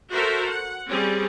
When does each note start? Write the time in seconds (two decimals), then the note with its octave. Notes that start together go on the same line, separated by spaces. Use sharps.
0.12 F#4 A4 A#4 C5 E5
0.48 F#5
0.90 G3 C4 C#4 G#4